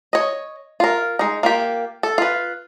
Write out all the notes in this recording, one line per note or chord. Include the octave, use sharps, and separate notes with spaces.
C#5 D#5
F4 A#4
G#3 D#4
A#3 F4 G4
A4
F4 B4